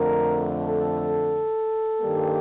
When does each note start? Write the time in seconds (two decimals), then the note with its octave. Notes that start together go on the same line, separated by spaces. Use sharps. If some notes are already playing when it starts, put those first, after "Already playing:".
Already playing: F2 D3 A3 A#4
0.66 A4
2.02 G2 D#3 G3 A#3